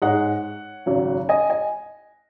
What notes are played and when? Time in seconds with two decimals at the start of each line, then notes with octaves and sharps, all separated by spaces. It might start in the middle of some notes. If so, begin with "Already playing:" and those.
0.02 G#2 G#3 D#4 C#5 F#5
0.86 G#1 F#2 C#3 F#3
1.29 D#5 G#5
1.50 D#5 G#5